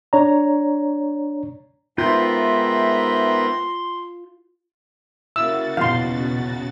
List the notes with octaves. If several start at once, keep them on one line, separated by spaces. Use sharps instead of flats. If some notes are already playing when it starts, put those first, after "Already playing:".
D4 C#5 D5 A#5
G#2 B3 F4 A#4 E5 G5 C6 G6
C#3 A#3 E4 F#4 E6 A6
A#1 E2 B2 F5 C6